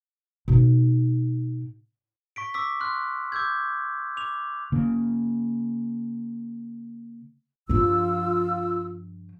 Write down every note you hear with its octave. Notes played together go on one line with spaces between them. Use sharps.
B2 D#4
C#6 B6 D7
C#6 D6 E6 B6
C6 F6 F#6
D6 E6 G6 G#6
D6 F7
C#3 A#3
G2 F3 F4 E6